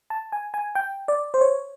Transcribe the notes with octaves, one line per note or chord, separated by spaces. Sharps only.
A5
G#5
G#5
G5
D5
C5
C#5